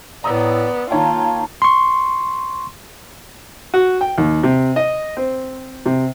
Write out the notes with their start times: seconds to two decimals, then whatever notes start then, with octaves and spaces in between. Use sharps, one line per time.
0.24 A2 B3 D5 A#5 D#6 E6
0.91 D#3 A#3 F4 C#5 G5 A5 A#5
1.62 C6 C#6
3.74 F#4
4.01 G5
4.18 D#2
4.43 C3
4.76 D#5
5.17 C4
5.86 C3